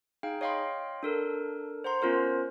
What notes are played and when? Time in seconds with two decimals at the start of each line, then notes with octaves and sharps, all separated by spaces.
0.23 D#4 G#4 F5 G5
0.41 C#5 D#5 F5 G5 B5 C6
1.03 D4 A4 A#4
1.84 C5 F#5 A#5 C6
2.02 B3 C#4 F4 A#4 C5